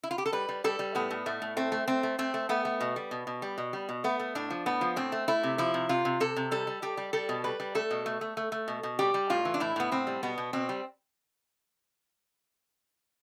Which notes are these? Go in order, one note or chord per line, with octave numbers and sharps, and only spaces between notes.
E4
F4
G4
A4
G3 B4
G3
G3 A4
G3
A2 B3
A2
A2 A3
A2
A3 C4
A3
A3 C4
A3
A3 C4
A3
A3 B3
A3
B2
G3
B2
B2
G3
B2
G3
B2
A3 B3
A3
A2 D4
F3
A2 B3
F3
A2 C4
A3
A3 E4
C3
F3 E4
C3
C3 F4
C3
C3 A4
C3
G3 A4
G3
G3 G4
G3
G3 A4
B2
G3 B4
G3
A3 A4
B2
A3
A3
A3
A3
B2
B2
G3 G4
G3
A2 F4
E3
D4
A2 E4
A2 B3
A2 C4
G3
B2 B3
B2
B2 C4
G3